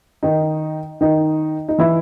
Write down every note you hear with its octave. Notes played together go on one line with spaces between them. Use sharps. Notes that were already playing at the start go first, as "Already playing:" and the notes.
D#3 D#4
D#3 D#4
D#4
E3 E4